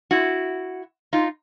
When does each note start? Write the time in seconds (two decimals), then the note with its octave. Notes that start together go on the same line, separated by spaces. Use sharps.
0.11 E4 F#4
1.13 D#4 F4